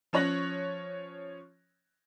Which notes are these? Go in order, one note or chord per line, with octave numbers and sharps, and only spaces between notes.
F3 C#4 C#5 F#6 A#6 F#7